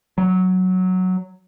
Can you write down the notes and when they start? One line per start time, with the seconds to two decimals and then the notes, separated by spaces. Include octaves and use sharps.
0.18 F#3